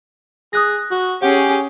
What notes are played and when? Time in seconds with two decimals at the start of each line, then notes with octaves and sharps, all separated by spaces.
0.53 G#4 D#6 F#6 A#6
0.91 F#4
1.22 C#4 G4 G#4 F#5